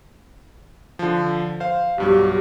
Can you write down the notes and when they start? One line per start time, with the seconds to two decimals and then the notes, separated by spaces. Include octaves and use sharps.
0.99 D3 F3
1.60 C5 F5
1.98 B1 G2 F#3 G4